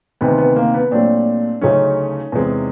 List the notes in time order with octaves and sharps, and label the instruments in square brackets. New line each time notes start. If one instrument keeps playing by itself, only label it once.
[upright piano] D2 C3 D#3 B3
B3
A#3
B3
A#2 F#3 A3 C4 D4
D2 C#3 F#3 A3 C#4 D#4
E2 C3 E3 G#3